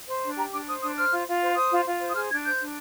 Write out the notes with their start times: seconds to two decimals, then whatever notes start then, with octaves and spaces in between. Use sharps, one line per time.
0.08 C5
0.23 D4
0.37 G4 A#5
0.53 D4 D6
0.67 C5 D#6
0.82 D4 D#6
0.96 C5 F6
1.12 F4
1.27 F4
1.42 C5
1.56 C5 D#6
1.71 F4
1.86 F4
2.01 C5
2.10 D#6
2.15 G#4 F6
2.30 D4 G#6
2.45 C5 G6
2.60 D4